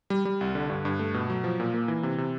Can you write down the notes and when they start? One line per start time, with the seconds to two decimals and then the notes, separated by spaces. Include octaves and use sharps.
0.10 G3
0.25 G3
0.41 C2
0.55 D3
0.70 G2
0.85 G2
0.99 A3
1.14 B2
1.30 F#3
1.44 F3
1.60 A#2
1.74 A#3
1.88 E3
2.03 C3
2.18 C3